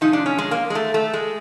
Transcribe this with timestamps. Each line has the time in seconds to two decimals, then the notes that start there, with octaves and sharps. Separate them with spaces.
0.01 C3 F3 G#3 D#4
0.13 D4
0.26 C#4
0.38 G#3
0.51 A#3
0.70 G#3
0.75 A3
0.94 A3
1.13 G#3